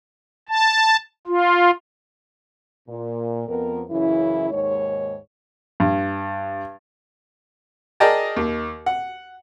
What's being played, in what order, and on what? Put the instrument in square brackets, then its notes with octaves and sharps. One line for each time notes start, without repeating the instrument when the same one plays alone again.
[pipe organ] A5
F4
[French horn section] A#2
F2 B3 A#4
F#2 C#3 E3 E4
D#2 G#2 G#3 C#5
[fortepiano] G2
G#4 A#4 D5 D#5 G5 A5
D#2
F#5